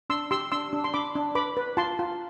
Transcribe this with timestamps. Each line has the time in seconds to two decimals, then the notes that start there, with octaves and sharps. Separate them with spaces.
0.10 D4 C6 E6
0.31 G4 C6 E6
0.52 D4 C6 E6
0.73 D4
0.84 C6
0.94 D4 B5 D6
1.15 D4
1.35 B4 B5 D6
1.57 B4
1.77 F4 A5 C6
1.99 F4